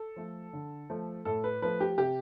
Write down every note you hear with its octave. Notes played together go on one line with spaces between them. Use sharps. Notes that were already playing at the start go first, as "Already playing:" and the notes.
Already playing: A4
F3 A3
D3
F3 A3
A2 A4
B4
F3 A3 B4
G4
C3 G4